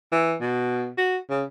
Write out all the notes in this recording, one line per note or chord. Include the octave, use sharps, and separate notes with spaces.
E3
B2
F#4
C#3